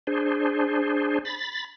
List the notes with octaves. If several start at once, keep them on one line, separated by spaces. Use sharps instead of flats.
D4 G#4 C5
B5 A6